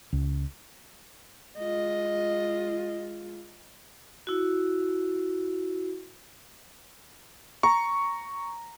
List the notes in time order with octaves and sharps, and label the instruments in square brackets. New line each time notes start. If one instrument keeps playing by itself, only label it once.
[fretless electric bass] C#2
[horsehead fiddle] G#3 F4 [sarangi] D#5
[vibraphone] E4 F#4
[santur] A#5 [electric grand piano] C#6